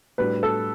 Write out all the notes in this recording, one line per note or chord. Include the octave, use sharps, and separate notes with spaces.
A2 G3 D4 F#4 B4
A4